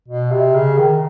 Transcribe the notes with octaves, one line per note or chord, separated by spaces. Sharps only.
B2
C3
C#3
D#3